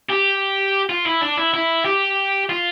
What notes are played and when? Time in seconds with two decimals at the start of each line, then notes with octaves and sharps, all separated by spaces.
0.09 G4
0.89 F4
1.06 E4
1.21 D4
1.37 E4
1.54 E4
1.85 G4
2.49 F4